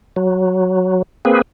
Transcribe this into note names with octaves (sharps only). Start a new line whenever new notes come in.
F#3
A#3 C4 G#4 B4